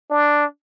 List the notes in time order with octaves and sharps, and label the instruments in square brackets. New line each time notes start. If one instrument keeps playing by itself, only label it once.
[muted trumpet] D4